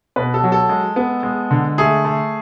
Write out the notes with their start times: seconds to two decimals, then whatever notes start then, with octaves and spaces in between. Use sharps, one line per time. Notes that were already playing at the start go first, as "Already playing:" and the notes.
0.16 B2 B4
0.34 A4
0.44 F#3
0.52 A4
0.69 G#3
0.96 B3
1.23 G#3
1.51 D3
1.78 A3 G#4
2.05 A3